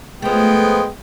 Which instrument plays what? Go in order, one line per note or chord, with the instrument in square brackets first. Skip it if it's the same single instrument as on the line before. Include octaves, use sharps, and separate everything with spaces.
[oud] F3 A3 [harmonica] G#3 B3 G5